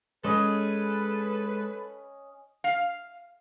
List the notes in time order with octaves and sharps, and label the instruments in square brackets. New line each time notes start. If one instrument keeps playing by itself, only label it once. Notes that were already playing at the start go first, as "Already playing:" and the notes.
[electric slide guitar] G#3 G#4 [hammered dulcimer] C#4 D#5 [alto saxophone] A4 [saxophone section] B4
[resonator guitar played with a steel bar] F5